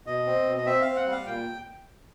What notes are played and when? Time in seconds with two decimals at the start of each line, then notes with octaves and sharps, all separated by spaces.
0.06 B2 D#5
0.26 C4
0.46 B2
0.57 D#5
0.66 C4 E5
0.81 C4 F5
0.96 F#5
1.06 G3
1.11 F5
1.26 A#2 G5